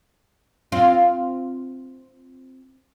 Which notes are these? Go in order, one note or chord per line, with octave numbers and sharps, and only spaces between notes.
C4 F4